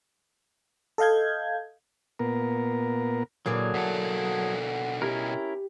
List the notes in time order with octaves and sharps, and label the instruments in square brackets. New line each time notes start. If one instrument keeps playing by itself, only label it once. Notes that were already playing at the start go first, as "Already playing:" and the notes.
[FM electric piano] A4 D#5 F5 G6 G#6
[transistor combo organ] A#2 B3 A#4
[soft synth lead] A#2 [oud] D3 E3 A#3 [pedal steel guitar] F#3 G#4
[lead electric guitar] B2 A4 [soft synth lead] F#5
[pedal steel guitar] C#4 E4 A#4 [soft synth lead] G4